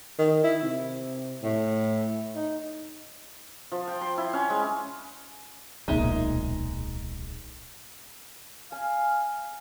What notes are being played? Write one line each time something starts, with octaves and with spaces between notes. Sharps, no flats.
D#3
E4
C3
A2
D#4
F3
G5
C6
E4
C#4
G#3
D1 B1 A#2 G#3 D#4 E5
F5 G#5